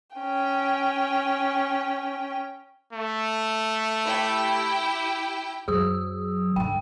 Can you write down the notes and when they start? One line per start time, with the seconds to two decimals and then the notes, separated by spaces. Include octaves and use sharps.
0.16 C#4 G5
2.93 A3
4.04 E4 G4 G5
5.68 F#2 F#3 G#4 D#6 E6
6.56 G2 D3 G5